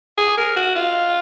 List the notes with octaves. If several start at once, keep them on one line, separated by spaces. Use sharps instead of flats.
G#4
A#4
F#4
F4